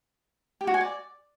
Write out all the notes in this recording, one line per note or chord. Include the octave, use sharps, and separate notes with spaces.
G4
F#4
G#5
D5